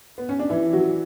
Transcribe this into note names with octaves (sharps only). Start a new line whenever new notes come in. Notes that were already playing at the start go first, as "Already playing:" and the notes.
B3
C#4
D4
E3 E4
F#3 F#4